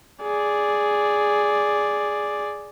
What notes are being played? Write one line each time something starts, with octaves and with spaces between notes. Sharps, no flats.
G#4 D5